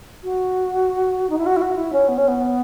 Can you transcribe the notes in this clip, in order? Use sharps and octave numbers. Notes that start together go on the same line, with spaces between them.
F#4
D#4
E4
F#4
E4
F#4
E4
C#4
B3
C#4
B3